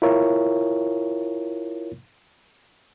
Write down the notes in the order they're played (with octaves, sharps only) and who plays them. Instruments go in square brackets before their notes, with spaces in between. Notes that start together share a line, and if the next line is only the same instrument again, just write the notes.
[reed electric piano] E4 F4 A#4 C#5